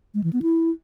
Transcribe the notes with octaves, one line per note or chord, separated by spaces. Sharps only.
G#3
E3
B3
E4